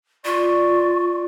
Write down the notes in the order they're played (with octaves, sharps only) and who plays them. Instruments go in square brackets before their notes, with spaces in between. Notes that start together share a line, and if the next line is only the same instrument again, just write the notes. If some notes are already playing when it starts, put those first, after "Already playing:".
[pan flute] F4 [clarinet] D5 [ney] C#6